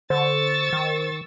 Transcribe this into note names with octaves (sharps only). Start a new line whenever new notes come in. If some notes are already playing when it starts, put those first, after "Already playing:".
D3 C5 C#6 E6 A6
D#3